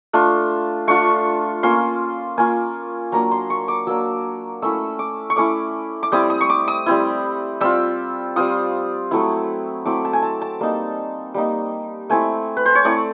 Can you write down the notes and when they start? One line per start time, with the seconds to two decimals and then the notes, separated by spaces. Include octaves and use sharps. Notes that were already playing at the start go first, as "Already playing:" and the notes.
0.13 A3 D4 F4
0.87 A3 D4 F4 C#6
1.63 A#3 C#4 F4 C6
2.38 A#3 C#4 F4 G#5
3.12 F#3 A#3 D4 A#5
3.31 C6
3.50 C#6
3.68 D6
3.87 F#3 A#3 D4 E6
4.62 A3 C#4 E4 E6
4.99 D6
5.30 C#6
5.36 A3 C#4 E4 D6
6.03 D6
6.12 G3 C4 E4 D#6
6.30 D#6
6.41 C#6
6.50 D6
6.68 D#6
6.86 G3 C4 E4
7.61 G3 C4 F4 E6
8.36 G3 C4 F4 D#6
9.11 F#3 A3 C4 E4
9.85 F#3 A3 C4 E4 D6
10.05 A5
10.13 G#5
10.23 A5
10.42 A5
10.60 G3 A#3 D#4
11.34 G3 A#3 D#4
12.10 A3 C4 E4 G#5
12.57 B4
12.66 C5
12.75 C#5
12.85 A3 C4 E4 D5